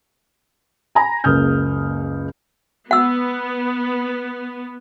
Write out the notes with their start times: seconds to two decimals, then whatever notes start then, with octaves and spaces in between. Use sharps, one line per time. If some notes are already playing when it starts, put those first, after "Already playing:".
0.95 G#5 A#5 B5
1.24 F#1 C#2 A#3 D#6 F6 G6
2.91 B3 F#5 E6